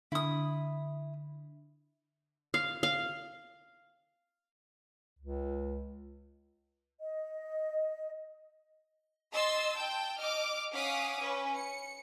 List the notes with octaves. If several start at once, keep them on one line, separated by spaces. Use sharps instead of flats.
D3 E4 D#6
F5
F5
C#2
D#5
D#5 C6 E6 A6
G5 A5 G6
D#5 D6 F6
C#4 F5 F#5 D6 D#6 B6
C#4 B4 G#5
C#7